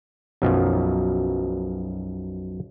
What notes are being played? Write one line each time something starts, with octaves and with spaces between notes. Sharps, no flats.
B1 F#2 B2 F3